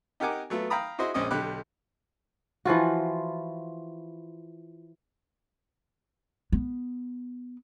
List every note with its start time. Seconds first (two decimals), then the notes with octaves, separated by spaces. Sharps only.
0.20 D#4 G4 A#4 F#5 G#5 D6
0.50 F#3 A3 B3 F4
0.70 F5 G5 A#5 B5 D#6
0.98 E4 F#4 G#4 C5 D#5
1.14 A#1 G#3 C4 C#4 D#5 D#6
1.31 B1 D3 G4 B5 F#6
2.65 E3 F3 F4 F#4
6.52 B3